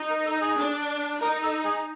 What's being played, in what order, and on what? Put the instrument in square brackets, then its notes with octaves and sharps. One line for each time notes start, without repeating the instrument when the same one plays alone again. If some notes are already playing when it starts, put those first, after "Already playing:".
Already playing: [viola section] D#4
[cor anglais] A#4
A4
G#4
[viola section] D4
[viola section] D#4 [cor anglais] A#4
[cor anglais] A4
G#4